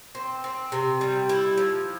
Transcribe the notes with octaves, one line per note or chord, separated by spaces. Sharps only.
C4
C4
C3
G3
E4
F3